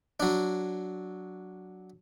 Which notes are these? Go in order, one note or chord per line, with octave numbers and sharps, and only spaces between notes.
F#3 D4